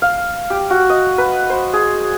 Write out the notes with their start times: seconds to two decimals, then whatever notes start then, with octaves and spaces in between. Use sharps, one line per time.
0.02 F5
0.50 G4
0.70 F#4
0.89 D#5
1.18 B4
1.50 C5
1.73 G#4